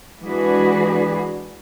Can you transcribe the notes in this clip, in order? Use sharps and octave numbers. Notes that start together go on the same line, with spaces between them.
E3 G#3 D4 F#4 G#4 B4